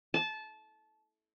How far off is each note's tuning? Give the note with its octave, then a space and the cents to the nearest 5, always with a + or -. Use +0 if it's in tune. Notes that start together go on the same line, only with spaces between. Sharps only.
A5 -20